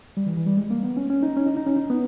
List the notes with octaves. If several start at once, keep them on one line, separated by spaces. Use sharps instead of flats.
G3
E3
E3
G3
G#3
A#3
B3
C#4
C#4
D#4
C#4
D#4
D#4
C#4
D#4
B3